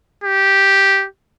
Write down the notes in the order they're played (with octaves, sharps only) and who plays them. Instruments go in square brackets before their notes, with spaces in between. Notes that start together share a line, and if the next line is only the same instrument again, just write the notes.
[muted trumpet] G4